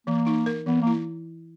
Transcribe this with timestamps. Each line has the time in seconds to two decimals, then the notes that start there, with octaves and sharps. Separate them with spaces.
0.07 E3 A#3
0.27 D#4
0.46 A#4
0.66 E3 B3
0.81 A#3
0.87 E4